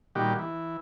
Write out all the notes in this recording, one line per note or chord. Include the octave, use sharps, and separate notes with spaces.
A#2 D#3 G3 F#4 G4
E3